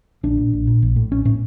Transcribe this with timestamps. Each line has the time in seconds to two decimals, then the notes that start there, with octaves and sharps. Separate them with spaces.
0.23 A#1 D4
0.37 A#2
0.53 A#1
0.67 A#2
0.83 A#1
0.96 A2
1.12 A#1 C#4
1.25 A2 C#4